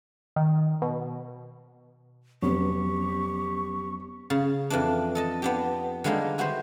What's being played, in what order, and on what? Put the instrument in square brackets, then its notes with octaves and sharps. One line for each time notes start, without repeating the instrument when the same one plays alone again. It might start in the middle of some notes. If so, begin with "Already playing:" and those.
[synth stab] D#3
B2
[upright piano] F1 [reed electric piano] F#3 B3 C#4 [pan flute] G4 [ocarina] C#6
[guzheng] C#3
F2 E3 D4
A4 D#5 A5
B3 D4 G4
D3 G3 G#3 A#3 D4 D#4
E4 F#4 G4 B4 C5